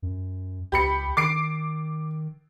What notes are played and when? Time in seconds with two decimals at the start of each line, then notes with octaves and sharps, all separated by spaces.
0.02 F#2
0.72 C#2 G4 B5 C#7
1.17 D#3 D6 C7 D7